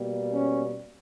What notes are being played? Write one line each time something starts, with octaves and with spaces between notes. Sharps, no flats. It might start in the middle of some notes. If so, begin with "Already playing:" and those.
Already playing: B2 G3 A#3
C#4